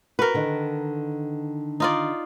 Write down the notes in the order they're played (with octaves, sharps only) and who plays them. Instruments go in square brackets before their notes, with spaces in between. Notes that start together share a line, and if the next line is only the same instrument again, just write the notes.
[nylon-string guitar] F#4 [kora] A#4 B4
[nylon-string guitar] D3 D#3
[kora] D#4 F4 D5